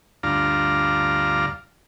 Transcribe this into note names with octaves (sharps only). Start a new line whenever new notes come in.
D2 G2 F4 D5 F5 A#5